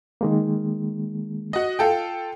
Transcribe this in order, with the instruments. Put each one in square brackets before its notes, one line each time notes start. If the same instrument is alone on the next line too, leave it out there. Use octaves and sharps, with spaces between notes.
[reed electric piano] D#3 G#3 A#3
[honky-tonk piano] F#4 D#5
F4 A4 G5